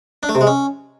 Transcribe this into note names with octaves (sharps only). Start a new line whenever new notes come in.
D4
A3
C3
G#3
C#4